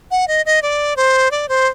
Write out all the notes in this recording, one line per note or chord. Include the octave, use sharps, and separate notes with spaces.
F#5
D#5
D#5
D5
C5
D5
C5